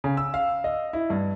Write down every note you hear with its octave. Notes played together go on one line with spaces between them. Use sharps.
C#3
E6
F5
D#5
E4
G2